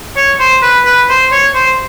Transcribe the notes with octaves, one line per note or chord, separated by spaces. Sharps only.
C#5
C5
B4
B4
C5
C#5
C5